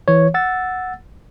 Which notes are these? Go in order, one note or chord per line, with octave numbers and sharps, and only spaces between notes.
E3 C#5
F#5 E6 A6